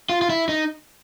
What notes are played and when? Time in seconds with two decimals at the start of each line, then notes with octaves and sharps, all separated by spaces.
0.09 F4
0.22 F4
0.30 E4
0.49 D#4